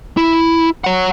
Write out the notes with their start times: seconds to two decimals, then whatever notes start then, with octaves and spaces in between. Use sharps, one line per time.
0.17 E4
0.84 C#5 F#5